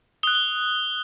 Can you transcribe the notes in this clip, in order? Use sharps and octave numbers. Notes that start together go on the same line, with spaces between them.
D#6 F#6 G7
G7